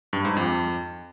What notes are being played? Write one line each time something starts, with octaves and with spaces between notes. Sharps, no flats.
G2
G#2
F2